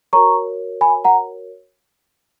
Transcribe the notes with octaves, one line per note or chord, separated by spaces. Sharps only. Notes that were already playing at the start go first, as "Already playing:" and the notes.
F#4 A#4 C#5 A#5 C#6
G#5 B5
F#5 A#5